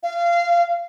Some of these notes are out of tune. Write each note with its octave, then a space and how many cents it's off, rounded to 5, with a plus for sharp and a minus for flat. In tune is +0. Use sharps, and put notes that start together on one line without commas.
F5 -25